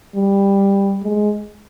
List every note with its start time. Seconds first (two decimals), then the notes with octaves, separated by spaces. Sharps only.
0.15 G3
1.03 G#3